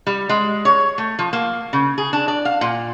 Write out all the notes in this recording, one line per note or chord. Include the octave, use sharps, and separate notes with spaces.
G3
G#3
C#5
A3
F3
A#3
C#3
G#4
D4
D5
F5
A#2